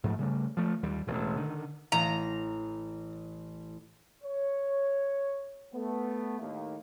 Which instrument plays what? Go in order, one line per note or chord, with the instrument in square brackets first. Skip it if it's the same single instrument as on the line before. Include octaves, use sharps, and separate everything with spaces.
[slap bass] G#2 F3 A3
C#3 G3 A3
F3 A3
D#2 G3
E1 A1
D3 D#3
[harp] A1 [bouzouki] A#5
[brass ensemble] C#5
A3 B3
D#2 A2 D#3 A#3